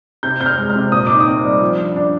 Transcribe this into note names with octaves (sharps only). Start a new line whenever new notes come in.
C3 G6
C4 G6
F6
G#3
F6
C3
A#2 D#6
D#4 D6
D#6
C4
G3
F3
D4
D4